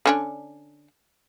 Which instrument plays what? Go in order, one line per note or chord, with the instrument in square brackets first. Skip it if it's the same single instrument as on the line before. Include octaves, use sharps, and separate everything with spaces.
[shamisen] D3 C#4 D4